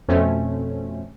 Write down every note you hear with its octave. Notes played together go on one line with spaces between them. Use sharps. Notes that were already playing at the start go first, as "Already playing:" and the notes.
F2 B2 A3 C4 C#4